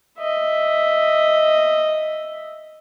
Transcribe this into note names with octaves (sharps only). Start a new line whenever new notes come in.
D#5 E5